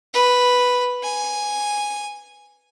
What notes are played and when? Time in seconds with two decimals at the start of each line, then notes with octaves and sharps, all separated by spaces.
0.14 B4
1.03 G#5